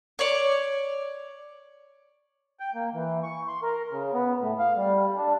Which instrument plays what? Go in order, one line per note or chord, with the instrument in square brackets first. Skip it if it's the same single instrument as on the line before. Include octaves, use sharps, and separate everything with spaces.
[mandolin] C#5 D5
[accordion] G5
A#3
E3
C#6
C6
A#4
C#3
B3
A2
F5
G3
D4